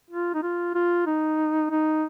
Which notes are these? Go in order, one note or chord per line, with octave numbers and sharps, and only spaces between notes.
F4
D#4
F4
F4
D#4
D#4